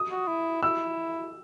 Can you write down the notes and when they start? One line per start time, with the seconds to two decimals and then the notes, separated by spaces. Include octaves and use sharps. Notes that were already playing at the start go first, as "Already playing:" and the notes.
Already playing: D#6
0.11 F#4
0.28 E4
0.62 E4 E6